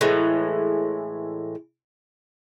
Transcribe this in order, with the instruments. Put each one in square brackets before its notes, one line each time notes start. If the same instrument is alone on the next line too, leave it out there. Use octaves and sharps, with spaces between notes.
[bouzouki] A2 E3 G#3